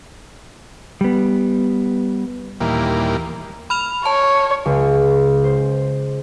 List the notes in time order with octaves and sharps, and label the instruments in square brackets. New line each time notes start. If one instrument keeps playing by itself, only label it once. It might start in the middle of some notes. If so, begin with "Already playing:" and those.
[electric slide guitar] G3 B3
[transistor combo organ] D#2 A#2 E3 G3 A#3
[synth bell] B5 F6 F7
[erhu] C#5 [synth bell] A5
[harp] C#2
C5